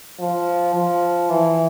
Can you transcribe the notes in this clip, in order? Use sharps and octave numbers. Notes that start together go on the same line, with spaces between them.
F3
F3
E3